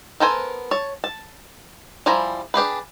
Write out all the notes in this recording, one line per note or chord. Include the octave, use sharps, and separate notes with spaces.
B3 A4 A#4 C5 G#5
C#5 A5
A5
F3 G3 E4 G#5 A#5
D4 G4 G#4 B4